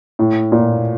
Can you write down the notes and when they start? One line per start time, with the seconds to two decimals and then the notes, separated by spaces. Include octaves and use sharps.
0.19 A2
0.52 A#2